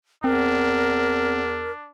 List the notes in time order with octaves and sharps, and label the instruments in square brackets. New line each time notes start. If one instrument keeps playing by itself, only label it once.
[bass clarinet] E2 [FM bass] C4 [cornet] D4 [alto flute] A#4